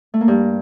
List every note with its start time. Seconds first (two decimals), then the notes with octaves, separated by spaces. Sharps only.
0.14 A3
0.21 A#3
0.28 G2